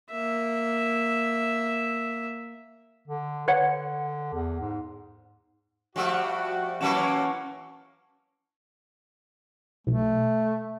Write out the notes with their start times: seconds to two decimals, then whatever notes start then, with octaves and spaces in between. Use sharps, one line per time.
0.11 A#3 E5
3.08 D3
3.48 D3 B4 C#5 F#5
4.33 E2
4.60 G#2
5.96 F3 G3 A3 F#4
6.81 A#2 E3 F#3 A#3 C#4 C#5 F#5 A5
9.87 B1 A3